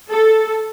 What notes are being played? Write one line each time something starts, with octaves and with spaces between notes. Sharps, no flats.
A4